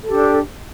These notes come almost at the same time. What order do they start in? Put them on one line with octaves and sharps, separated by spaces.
A4 G4 D4